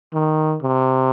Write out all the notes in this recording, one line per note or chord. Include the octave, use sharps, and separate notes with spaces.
D#3
C3